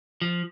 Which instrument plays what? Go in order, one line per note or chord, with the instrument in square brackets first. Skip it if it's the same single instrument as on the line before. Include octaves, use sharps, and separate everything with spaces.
[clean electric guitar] F3